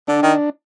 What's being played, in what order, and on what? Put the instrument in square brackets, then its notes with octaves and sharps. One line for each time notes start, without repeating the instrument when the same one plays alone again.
[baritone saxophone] D3 [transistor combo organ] D4
[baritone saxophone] D#3